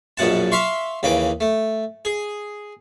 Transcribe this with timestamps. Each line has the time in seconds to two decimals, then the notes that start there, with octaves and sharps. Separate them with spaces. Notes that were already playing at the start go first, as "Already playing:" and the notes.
0.17 A#1 F#2 B2 F#5 A5
0.52 E5 F5 C6 C#6
1.03 D#2 C#3 E3 D6
1.40 A3
2.05 G#4